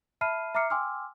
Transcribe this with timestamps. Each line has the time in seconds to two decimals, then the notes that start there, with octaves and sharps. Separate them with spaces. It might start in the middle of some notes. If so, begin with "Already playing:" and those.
0.21 E5 A5 B5 F6 C7 D#7
0.55 E5 A#5 D6 F6 C7 C#7
0.70 G5 G#5 C6 D6 E6 F6